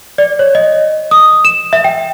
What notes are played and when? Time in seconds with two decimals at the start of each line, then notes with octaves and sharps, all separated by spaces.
0.18 D5
0.39 C#5
0.55 D#5
1.11 D#6
1.45 E7
1.73 E5
1.84 G5